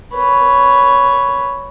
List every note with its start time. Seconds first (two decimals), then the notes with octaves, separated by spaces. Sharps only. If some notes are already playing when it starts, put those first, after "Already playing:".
0.14 B4 C#5